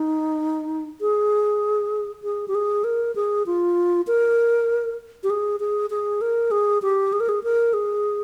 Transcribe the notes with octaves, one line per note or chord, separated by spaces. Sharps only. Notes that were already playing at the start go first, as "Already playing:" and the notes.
Already playing: D#4
G#4
G#4
G4
G#4
A#4
G#4
F4
A#4
G4
G#4
G#4
G#4
A#4
G#4
G4
G#4
A#4
G#4
A#4
G#4